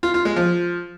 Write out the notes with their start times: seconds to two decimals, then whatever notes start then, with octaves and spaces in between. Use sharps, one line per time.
0.03 F4
0.14 F4
0.25 G#3
0.36 F3